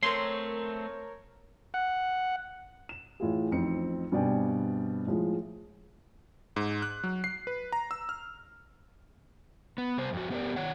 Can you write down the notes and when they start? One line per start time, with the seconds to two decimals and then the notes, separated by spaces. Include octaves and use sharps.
0.03 A3 C4 A#4 C#5 C6
1.74 F#5
2.89 E7
3.20 A2 E3 F4 G#4
3.51 A1 F2 C4 D#4 C#7
4.12 G2 B2 C4 D5 G5 G#5
5.07 A2 F3 G#3
6.56 G#2
6.82 F#6
7.04 F#3
7.24 C7
7.47 B4
7.72 A#5
7.91 E6
8.09 F6
9.78 B3
9.98 C3 G3 C5
10.13 F2 F#4
10.30 B3 G4 A#4 D5
10.56 D#3 C#5 F#5